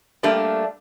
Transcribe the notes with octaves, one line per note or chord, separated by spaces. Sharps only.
G3 A3 A#3 D4 G4 D5